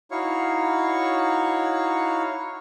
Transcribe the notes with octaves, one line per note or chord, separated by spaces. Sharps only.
D#4 E4 F#4 C#5 F5 C#6